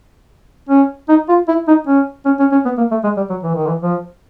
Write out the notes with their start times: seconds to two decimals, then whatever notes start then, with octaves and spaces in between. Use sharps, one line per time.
0.69 C#4
1.09 D#4
1.29 F4
1.48 E4
1.68 D#4
1.87 C#4
2.25 C#4
2.39 C#4
2.52 C#4
2.65 B3
2.78 A#3
2.91 A3
3.04 G#3
3.17 G3
3.30 F#3
3.43 E3
3.55 D#3
3.67 E3
3.83 F3